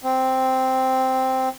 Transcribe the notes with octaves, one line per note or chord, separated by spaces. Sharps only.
C4